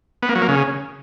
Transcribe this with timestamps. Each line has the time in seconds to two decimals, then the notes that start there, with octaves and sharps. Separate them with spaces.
0.23 B3
0.29 A#3
0.35 F#3
0.42 A#3
0.48 C#3